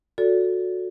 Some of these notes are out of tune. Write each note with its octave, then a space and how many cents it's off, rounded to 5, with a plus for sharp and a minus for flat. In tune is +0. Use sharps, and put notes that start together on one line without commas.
F#4 -20 A4 +0 D5 -35